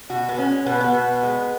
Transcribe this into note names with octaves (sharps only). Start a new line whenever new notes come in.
B2 F#4
B3
G#3 C#4
B2 B3
B3
B2
G#3